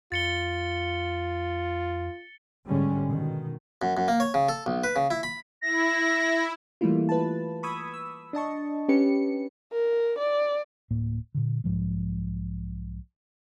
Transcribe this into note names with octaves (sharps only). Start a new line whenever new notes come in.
F2 F4 A6 C#7 G7
G#2 D3 G3 G#3 C#4
B2 D#3
F#2
F#2
A#3
C#5
C#3
A4
B1
B4
C#3
E4
B5
E4 A#6
E3 G3 A3 A#3 E4 F4
B4 A5
B5 C#6 D#6 E6 G#6
E6
D4 D#5 A5 C#6
C#4 G4 B4 C#7
A#4
D5
D1 A2 A#3
A#2 D3
B1 G#2 F3 G#3